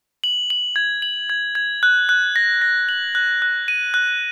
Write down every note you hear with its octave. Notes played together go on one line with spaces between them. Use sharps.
F#7
F#7
G#6
F#7
G#6
G#6
F#6
F#6
A#6
A#6
F#7
F#6
F#6
D#7
F#6